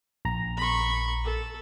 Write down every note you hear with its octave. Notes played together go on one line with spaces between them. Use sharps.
A#1 A#5
B5 C#6
A4